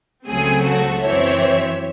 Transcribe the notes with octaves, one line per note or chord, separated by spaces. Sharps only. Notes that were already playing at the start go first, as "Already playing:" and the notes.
C#2 C#3 F#3 A3 C4 G#4
F#4 A4
F#2 E3 C4 C#5 E5